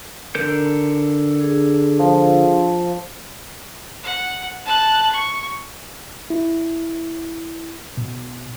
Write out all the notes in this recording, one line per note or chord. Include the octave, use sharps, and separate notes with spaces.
D3 A#4 G6
D4 G#4 A4
F3
F#5
A5 F#6
C#6
E4
B2